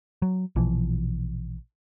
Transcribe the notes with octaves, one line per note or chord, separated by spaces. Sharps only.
F#3
A#1 B2 E3 F3